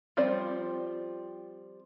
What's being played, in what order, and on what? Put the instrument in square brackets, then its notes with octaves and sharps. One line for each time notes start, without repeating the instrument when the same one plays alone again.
[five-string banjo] F3 G3 C4 C5 D5